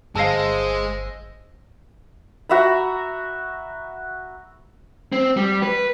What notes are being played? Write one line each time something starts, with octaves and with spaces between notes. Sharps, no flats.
G1 G#3 C5 D#5 F5 A5 E6 A#6
F#4 E5 A#5 B5
C4
G3
B4